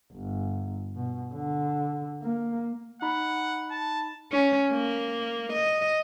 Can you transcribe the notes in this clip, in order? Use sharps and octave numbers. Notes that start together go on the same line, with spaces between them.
G1
B2
D3
A#3
D#4 F#5 B5
A5
C#4
A#3
D#5